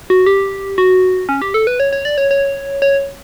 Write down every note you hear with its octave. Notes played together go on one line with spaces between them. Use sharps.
F#4
G4
F#4
C#4
G4
A4
B4
C#5
C#5
D5
C#5
C#5
C#5